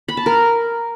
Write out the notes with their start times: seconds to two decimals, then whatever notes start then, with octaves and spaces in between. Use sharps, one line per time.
0.08 B5
0.17 A5
0.26 A#4